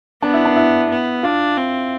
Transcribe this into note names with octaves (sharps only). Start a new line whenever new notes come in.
B3 D4
E4
D4
E4
B3
D4 F4
C4